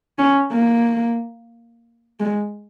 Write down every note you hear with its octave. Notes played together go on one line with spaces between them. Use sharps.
C#4
A#3
G#3